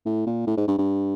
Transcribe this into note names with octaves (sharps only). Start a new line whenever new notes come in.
A2
A#2
A2
G#2
G2
G2